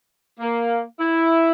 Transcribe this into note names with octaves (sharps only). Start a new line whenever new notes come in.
A#3
E4